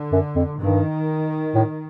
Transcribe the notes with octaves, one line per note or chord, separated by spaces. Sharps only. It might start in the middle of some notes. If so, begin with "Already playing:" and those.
Already playing: D3
F#2
F2
G2 D#3
A2